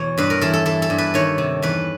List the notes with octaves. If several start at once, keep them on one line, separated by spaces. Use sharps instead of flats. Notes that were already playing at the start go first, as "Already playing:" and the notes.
Already playing: E2 B2 C#5
G2 B4
A#4
E3 A4
A4
E3 A4
A4
G2
B4
D#3 C#5
C3
E2 B4